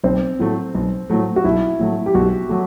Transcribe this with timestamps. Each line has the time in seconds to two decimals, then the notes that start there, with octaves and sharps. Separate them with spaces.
0.04 B1 C4
0.39 A2 F#3 A3
0.75 B1
1.10 A2 F#3 A3
1.36 F#4
1.44 B1 E4
1.79 A2 F#3 A3
2.06 G4
2.14 B1 F#4
2.49 F#3 A3